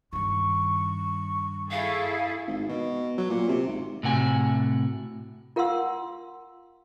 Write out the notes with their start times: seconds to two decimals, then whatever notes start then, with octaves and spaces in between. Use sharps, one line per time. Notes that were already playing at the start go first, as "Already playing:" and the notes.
0.13 G2 D#3 C#6
1.71 E4 G#4 A4 F5
2.47 G#1
2.68 B2
3.18 F#3
3.30 A#2
3.49 C3
3.67 G#1
4.03 A2 C3 F#4 G#5
5.56 F4 A#4 F5 F#5 C6 E6